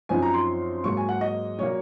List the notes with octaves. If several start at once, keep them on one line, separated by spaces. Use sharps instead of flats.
F#2 F3 C4 D#4 G#5
A#5
C6
G#2 F#3 A#3 C#6
G#5
F#5
D#5
A#2 F#3 A#3 C#5